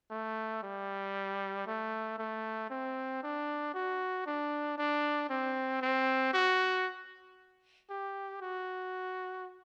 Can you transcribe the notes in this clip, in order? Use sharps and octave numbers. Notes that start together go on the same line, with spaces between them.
A3
G3
A3
A3
C4
D4
F#4
D4
D4
C4
C4
F#4
G4
F#4